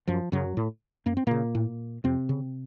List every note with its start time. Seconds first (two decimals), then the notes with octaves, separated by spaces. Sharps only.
0.07 F#2 F3
0.32 F#2 C#3 F#3
0.57 A2
1.06 F#2 A#3
1.17 C4
1.27 A#2 C#3 A#3
1.55 A2
2.04 F2 C3 C4
2.29 C#3